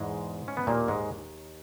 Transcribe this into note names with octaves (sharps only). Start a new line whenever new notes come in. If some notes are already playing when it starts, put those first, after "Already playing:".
Already playing: E2 G#2 B2 G#3
C#4
B3
D#2 A#2 D#3 A#3
G#2 G#3